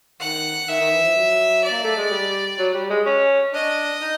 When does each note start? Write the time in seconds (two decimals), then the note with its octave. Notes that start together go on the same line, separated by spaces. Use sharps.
0.20 D#3 F#5
0.68 D#3 E5
0.81 D#3
0.92 E3
1.04 F3
1.16 F#3
1.64 D5
1.70 A#3
1.84 A3
1.97 G#3
2.11 G3
2.58 F#3
2.74 G3
2.90 G#3
3.06 C#4
3.53 D4 D#5
4.01 D#4